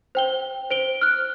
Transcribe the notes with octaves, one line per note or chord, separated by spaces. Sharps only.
C5 G5 G7
C5 D7 G7
F6 F#6